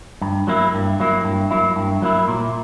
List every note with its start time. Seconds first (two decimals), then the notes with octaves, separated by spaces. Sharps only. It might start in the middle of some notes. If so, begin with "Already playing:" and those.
0.21 G2
0.47 F#3 A#3 E4
0.74 G2
1.00 F#3 A#3 E4
1.24 G2
1.51 F#3 A#3 E4
1.76 G2
2.02 F#3 A#3 E4
2.28 A#2